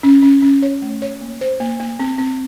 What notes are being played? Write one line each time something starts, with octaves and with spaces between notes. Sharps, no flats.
C#4
C#4
C#4
C#5
A3
C#5
A#3
C5
A#3
A#3
C4
C4